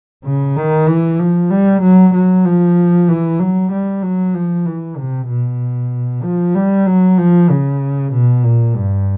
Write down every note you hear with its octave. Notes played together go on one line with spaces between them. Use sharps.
C#3
D#3
E3
F3
G3
F#3
F#3
F3
E3
F#3
G3
F#3
F3
E3
C3
B2
F3
G3
F#3
F3
C#3
B2
A#2
G2